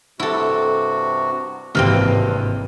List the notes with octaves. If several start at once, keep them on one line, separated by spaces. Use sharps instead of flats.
G2 C3 E4 F#4 A4
G#1 G2 C3 E3 A#3 C4 B4 F6